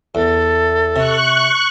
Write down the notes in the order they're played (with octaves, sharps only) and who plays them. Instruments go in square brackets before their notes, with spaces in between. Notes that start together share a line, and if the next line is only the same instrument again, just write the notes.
[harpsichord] E2 [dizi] A4
[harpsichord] C3 [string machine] C#6 F#6